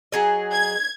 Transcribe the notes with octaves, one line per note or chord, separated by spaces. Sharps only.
F#3 G#4 D#5
G#6